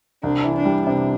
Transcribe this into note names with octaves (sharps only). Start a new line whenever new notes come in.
C2 D4
E3
D4
G3
C3 D4